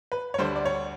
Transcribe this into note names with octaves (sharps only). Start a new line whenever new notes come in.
B4
C#5
D2 D3 G3 C5
D5
C#5